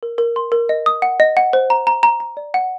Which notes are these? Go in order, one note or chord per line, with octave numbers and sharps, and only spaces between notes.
A#4
A#4
C6
A#4
D#5
D#6
F#5
D#5
F#5
C5
A#5
A#5
A#5
A#5
D5
F#5